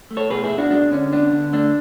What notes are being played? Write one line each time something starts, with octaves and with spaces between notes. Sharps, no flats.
A3
A4 C#5
B2 G#4 B4
E4 G#4
B2
D4 F#4
G#3 D4
D3 C#4
B3 D4
D3
A3 D4